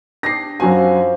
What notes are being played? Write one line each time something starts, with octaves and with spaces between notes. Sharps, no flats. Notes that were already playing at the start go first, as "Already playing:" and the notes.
D4 G4 G#4 A#6 C7
F#2 F3 F#4 G#5